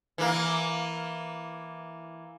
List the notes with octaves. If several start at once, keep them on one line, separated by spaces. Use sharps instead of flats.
E3 A#3